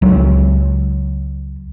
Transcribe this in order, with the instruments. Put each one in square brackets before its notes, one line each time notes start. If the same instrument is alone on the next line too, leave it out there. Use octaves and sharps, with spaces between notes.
[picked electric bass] C#2 F#3